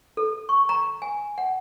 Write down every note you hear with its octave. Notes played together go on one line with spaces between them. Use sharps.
A4
C#6
A#5
G#5
F#5